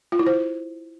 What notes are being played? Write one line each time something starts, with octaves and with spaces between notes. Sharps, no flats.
F4
E4
C5